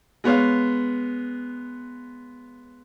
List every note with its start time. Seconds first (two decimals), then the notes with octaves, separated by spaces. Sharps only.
0.24 G#3 B3 C#5 F5